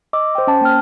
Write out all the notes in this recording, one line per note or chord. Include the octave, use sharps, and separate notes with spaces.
D#5 D6 E6
C5 G5
C#4 A5
A#3 G5 F6